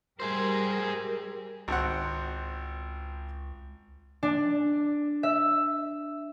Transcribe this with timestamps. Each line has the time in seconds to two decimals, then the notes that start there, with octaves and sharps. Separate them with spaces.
0.20 G3 G4 G#4 A#4 C5
1.68 G#1 C#2 C4 F#5
4.23 D4
5.23 E5